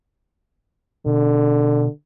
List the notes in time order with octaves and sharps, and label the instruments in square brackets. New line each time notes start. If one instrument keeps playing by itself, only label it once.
[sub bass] B2 [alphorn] D3